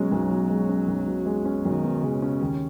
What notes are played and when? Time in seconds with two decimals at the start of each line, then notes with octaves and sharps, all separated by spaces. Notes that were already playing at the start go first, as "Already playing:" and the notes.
Already playing: B2 F#3 G#3 C#4
0.12 B1
0.31 B2
0.50 G#3
0.69 C#4
0.88 B1
1.07 B2
1.26 G#3
1.45 C#4
1.65 B1 D#3
1.84 B2
2.03 C#3 G#3
2.22 C#4
2.41 D#2